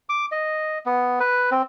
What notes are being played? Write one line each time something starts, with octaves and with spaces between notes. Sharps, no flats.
D6
D#5
B3
B4
C4